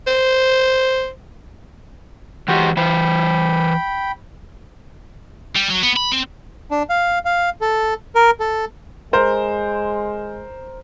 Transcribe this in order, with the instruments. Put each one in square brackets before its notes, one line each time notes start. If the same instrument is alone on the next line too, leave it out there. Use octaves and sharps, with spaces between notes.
[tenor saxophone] C5
[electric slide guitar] E3 G#3 G4 [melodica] F#4 C5 G5
[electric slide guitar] E3 C5 [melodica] G5 B5
[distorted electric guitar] G3
F#3
B3
B5
C4
[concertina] D4
F5
F5
A4
A#4
A4
[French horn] G#3 [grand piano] A#4 C5